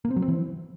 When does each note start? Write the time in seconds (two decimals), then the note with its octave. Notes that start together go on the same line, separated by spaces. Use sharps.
0.05 A#3
0.11 C4
0.16 F#3
0.22 C4
0.28 E3